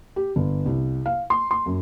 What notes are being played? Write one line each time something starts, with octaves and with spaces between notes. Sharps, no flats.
G4
G1
C2
F5
C6
C6
F#2